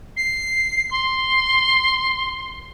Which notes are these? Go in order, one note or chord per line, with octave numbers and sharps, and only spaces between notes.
C7
C6